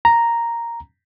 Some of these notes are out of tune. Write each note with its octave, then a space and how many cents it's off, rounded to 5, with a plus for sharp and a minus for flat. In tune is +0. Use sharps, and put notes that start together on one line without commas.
A#5 +0